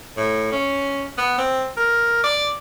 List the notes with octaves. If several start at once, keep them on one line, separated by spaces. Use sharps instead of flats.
A2
C#4
B3
C4
A#4
D5